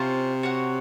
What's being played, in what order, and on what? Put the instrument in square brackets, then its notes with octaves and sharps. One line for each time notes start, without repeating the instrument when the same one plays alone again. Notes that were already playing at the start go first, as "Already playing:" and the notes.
Already playing: [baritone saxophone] C3 [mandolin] C#4 F4 C5
[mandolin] F#4 C#5 F#5